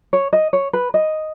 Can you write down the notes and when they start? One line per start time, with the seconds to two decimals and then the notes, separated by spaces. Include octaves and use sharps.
0.13 C#5
0.33 D#5
0.53 C#5
0.73 B4
0.94 D#5